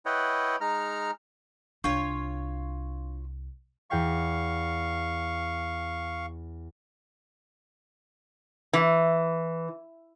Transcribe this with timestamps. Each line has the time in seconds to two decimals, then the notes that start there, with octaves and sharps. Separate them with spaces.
0.06 E4 B4 C#5 D#5 F#5 G5
0.61 G#3 D#4 A#5 F6
1.84 C2 D4 F4 C#5 C#6
3.90 E2 F5 G5 C#6 B6
8.73 E3